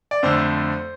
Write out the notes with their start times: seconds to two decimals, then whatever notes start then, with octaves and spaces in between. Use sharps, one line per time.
0.11 D5
0.23 F2 D3 A3 C5
0.37 C5